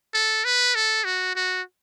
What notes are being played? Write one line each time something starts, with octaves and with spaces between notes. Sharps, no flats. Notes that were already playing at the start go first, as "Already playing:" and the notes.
A4
B4
A4
F#4
F#4